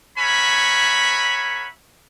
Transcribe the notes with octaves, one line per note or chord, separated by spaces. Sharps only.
A#4 C#5 E5 F#5 G#5 B5